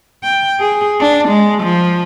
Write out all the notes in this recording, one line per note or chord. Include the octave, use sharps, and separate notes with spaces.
G5
G#4
D4
G#3
F3